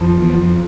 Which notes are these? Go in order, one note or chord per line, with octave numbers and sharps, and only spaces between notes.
F2 F3
E2
F3
F2